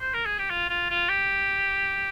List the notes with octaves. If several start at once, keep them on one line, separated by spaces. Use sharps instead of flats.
C5
A#4
G#4
G4
F4
F4
F4
G4